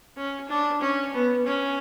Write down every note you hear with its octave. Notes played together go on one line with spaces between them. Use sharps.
C#4
D4
C#4
B3
C#4